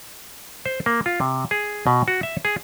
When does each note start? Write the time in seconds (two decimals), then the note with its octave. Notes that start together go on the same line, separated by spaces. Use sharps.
0.66 C5
0.86 A#3
1.06 F4
1.21 C3
1.51 G#4
1.87 B2
2.08 F#4
2.23 E5
2.45 G#4